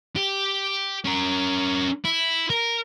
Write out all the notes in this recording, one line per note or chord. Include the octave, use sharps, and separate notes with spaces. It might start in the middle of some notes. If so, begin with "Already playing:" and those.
G4
C#4 A#4
E4
A#4